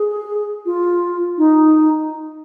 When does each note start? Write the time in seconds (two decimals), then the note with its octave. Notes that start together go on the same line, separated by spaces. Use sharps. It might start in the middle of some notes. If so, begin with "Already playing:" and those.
Already playing: G#4
0.66 F4
1.38 D#4